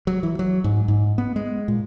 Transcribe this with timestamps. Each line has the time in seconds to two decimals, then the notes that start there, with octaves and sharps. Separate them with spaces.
0.07 F#3
0.23 E3
0.39 F#3
0.64 G#2
0.88 G#2
1.18 B3
1.36 G#3
1.68 A#2